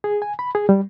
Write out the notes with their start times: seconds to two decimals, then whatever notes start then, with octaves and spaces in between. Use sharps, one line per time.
0.04 G#4
0.22 G#5
0.39 B5
0.55 G#4
0.69 G3